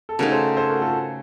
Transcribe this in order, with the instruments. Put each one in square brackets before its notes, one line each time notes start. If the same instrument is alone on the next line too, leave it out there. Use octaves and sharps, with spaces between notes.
[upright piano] A4
[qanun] C#3 A3 D#4 [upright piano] F#4 A#4
[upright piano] A4 C5
A4 C5
F#4 A#4
F4 A4